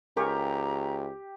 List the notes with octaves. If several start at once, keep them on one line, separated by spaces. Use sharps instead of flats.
C#2 G4 A#4 G#5 A#5 C#6